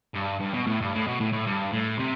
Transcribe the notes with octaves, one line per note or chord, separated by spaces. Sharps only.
G2
G2
B2
A2
G2
A2
B2
A2
A2
G2
A2
C3